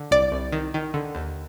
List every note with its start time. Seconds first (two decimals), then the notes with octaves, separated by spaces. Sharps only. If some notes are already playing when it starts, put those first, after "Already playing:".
Already playing: D3
0.11 C2 D5
0.32 C2
0.52 D#3
0.74 D#3
0.94 D3
1.15 D#2